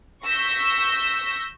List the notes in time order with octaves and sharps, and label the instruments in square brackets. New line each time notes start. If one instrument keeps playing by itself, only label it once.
[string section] C#6 E6 G6 A#6 B6